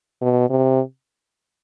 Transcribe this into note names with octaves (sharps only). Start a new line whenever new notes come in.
B2
C3